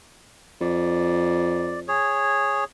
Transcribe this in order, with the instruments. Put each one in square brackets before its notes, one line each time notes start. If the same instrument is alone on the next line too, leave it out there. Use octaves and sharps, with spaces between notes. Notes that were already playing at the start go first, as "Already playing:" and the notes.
[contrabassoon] F2 [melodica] D5
[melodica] G#4 C#5